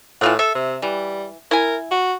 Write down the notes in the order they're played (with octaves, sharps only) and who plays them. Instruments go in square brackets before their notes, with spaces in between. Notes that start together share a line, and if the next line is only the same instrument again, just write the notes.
[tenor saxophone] A2 [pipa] E3 F4 F#5
[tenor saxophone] A4 [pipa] E5
[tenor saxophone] C3
[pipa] E3 [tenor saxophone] G3
[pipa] E4 G#5 [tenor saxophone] A#4
[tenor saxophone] F#4